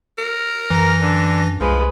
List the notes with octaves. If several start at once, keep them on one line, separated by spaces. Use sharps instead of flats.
A#4
F#2 E3 A#5 A#6
D3 D4
C2 F3 G#3 B4